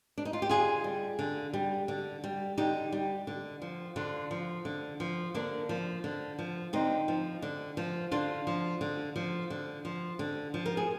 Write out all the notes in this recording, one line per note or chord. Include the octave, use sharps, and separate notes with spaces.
D4
D#4
F4
G4
D3 F4 G#4
G3
D3
G3
D3
G3
D3 D#4 G4
G3
D3
F3
D3 D4 F4
F3
D3
F3
D3 A#3 D4
F3
D3
F3
D3 C4 D#4
F3
D3
F3
D3 D4 F4
F3
D3
F3
D3
F3
D3
F3
A#4
G#4